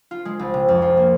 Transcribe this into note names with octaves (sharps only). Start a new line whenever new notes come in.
F4
G#3
C2
C3
F2
F4
A#3